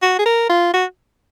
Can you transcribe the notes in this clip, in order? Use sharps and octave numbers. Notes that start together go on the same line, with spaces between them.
F#4
G#4
A#4
F4
F#4